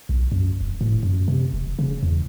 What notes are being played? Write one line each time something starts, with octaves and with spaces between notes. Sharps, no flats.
B1
F#2
E1
A2
F#2
C3
E1
C#3
E2